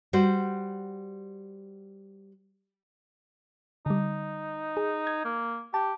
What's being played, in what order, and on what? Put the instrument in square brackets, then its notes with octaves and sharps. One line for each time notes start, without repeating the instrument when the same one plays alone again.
[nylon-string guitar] G3 F#4 C5
[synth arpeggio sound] D3 G3 [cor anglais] D#4
[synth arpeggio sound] G#4
G#6
[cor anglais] A#3
[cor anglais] G4 [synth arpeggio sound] A5